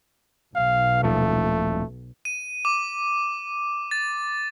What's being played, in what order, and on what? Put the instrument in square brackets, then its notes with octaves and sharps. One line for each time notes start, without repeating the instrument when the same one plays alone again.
[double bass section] B1 [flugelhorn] F5
[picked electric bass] D#1 F3 [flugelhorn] A3
[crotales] D#7
D6
A6